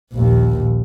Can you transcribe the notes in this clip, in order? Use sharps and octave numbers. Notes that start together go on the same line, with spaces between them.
A#1 D#2